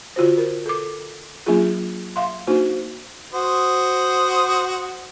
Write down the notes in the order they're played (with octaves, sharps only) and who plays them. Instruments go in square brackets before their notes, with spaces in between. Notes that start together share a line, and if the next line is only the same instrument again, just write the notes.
[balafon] D3 F4 F#4 C5
A#4
A4 D6
F#3 A#3 C#4 D4 F4 G#4
E5 F5 C6
A#3 D4 D#4 F#4 C5
[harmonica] F#4 C5 D#6